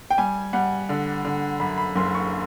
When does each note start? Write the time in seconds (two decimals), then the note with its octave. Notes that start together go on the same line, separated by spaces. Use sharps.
0.10 G5
0.18 G3 G#5
0.53 G3 F#5
0.89 D3
1.25 D3
1.60 F#2 B5
1.78 B5
1.96 F#1 C6
2.14 C#6